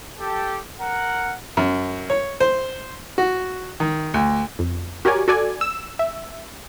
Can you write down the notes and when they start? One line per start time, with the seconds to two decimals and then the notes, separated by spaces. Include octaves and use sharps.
0.19 G4 A4
0.80 A#4 F#5
1.57 F#2
2.10 C#5
2.40 C5
3.18 F#4
3.80 D#3
4.14 D2
4.59 F2
5.05 F#4 G4 A#4 C#5 D5 G#5
5.28 F#4 A4 D5 G#5
5.61 E6
5.99 E5